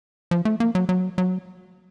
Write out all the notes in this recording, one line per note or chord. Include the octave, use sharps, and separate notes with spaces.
F3
A3
A#3
F#3
F#3
F#3